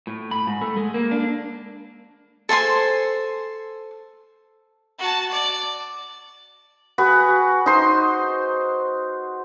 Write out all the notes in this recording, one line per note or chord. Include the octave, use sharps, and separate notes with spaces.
A2
B5
G#2
A3
G#3
A#3
D4
A4 C5 G#5 C6
F#4 A5
D5
F#4 G#4 B4
D#4 C5 C6